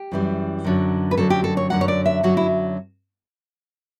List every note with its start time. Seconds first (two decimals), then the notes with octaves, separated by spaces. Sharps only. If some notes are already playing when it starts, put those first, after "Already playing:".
Already playing: G4
0.12 F#2 E3 G3
0.65 F#2 D3 F#3
1.11 B4
1.17 F#2 D3 F#3 A4
1.30 G4
1.44 A4
1.57 C#5
1.70 F#2 D3 F#3 F#5
1.81 C#5
1.88 D5
2.06 E5
2.23 F#2 D3 F#3 F#4
2.37 E4